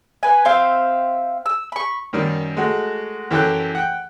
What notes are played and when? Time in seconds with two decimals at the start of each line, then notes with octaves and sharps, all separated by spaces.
0.23 B4 G#5
0.45 C4 C5 E5 F5
1.46 E6
1.72 B5 C#6
2.13 F#2 D#3 G3
2.57 G#3 A3 F#4
3.31 F#2 E3 G4 A4 G5 F#6
3.75 F#5 G5